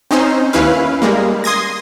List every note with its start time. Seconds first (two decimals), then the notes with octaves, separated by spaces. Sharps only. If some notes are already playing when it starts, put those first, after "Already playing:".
0.11 C4 C#4 D#4 C5
0.53 D#2 C#4 E4 B4 F5
1.02 G3 G#3 A#3
1.44 C6 D#6 G#6 A#6